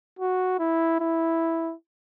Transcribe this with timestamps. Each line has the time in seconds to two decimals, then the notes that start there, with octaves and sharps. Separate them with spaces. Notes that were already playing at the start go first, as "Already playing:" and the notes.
0.19 F#4
0.59 E4
1.00 E4